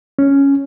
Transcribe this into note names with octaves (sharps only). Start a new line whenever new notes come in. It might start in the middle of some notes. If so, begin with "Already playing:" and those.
C#4